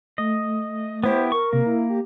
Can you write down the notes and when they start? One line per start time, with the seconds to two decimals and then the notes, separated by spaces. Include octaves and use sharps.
0.18 A3 D#5
1.04 B3 E4 G4 C5
1.32 A#4 C#6
1.53 C3 A#3
1.66 E4
1.90 G4